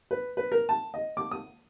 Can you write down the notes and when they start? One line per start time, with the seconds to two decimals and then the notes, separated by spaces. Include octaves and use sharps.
0.11 B4
0.37 B4
0.52 A#4
0.69 A5
0.94 D#5
1.17 D6
1.31 D#6